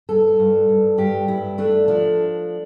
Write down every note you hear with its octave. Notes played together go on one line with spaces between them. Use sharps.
G2 A4
G2
G2
G2 G4
G2 E4
A3 D4
F3 D4